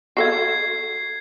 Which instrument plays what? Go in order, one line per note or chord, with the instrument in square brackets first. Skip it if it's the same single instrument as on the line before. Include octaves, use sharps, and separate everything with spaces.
[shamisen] F#4 A4 F5 [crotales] G#6 C7